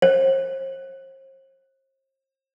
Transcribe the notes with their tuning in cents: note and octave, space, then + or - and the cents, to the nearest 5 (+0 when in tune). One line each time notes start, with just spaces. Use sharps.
C5 +40